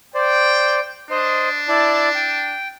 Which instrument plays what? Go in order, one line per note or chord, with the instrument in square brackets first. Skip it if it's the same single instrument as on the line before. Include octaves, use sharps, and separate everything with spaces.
[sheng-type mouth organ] C5 D5 [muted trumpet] G5
[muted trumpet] D4 [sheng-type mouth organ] C5 D#5
[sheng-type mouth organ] E4 D5 A5
G5